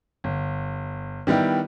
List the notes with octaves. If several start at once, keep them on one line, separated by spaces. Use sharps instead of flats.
G1
D#3 G3 B3 E4 G4